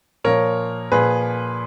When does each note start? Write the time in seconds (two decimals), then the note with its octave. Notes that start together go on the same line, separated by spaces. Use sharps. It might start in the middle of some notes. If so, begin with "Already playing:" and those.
0.24 A#2 F3 A#4 C#5
0.92 A#2 F3 G#4 B4